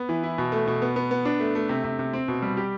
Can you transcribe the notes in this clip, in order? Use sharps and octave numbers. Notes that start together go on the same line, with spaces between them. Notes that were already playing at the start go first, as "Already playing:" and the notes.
Already playing: B3
E3
E4
B2
A3
B2
B3
B3
B3
D4
A3
A3
C3
C3
C3
C4
B2
G3
G4